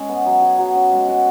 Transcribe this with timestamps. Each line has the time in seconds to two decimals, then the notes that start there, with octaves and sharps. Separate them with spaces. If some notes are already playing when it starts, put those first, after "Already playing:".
Already playing: G#3 C#4 G#4
0.09 B3
0.26 F#3
0.42 G#4
0.58 F#3
0.75 C#4
0.92 G#3
1.08 F#4